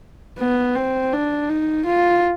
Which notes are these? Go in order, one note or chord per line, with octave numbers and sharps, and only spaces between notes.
B3
C4
D4
D#4
F4